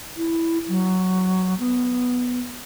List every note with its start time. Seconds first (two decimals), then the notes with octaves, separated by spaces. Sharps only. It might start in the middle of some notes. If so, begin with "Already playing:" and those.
0.17 E4
0.68 F#3
1.59 B3